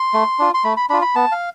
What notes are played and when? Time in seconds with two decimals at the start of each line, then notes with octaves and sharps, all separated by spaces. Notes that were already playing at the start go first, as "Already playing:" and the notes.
Already playing: C6
0.14 A3
0.39 D4 F4
0.54 C6
0.64 A3 B5
0.77 B5
0.90 D4 B5
0.93 F4
1.02 B5
1.15 B3 A5
1.32 F5